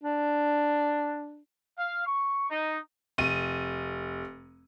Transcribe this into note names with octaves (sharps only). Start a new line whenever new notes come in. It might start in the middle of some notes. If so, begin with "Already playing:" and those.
D4
F5
C#6
D#4
F1 D#7